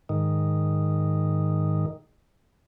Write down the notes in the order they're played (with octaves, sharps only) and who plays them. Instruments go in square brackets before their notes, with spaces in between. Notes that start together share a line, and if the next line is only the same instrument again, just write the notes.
[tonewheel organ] G#2 D#3